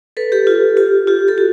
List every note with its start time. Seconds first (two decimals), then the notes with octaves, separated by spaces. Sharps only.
0.17 A4 B4
0.32 G4 A4
0.47 F4 G4
0.77 F4 G4
1.07 F4 G4
1.28 G4 A4
1.38 F#4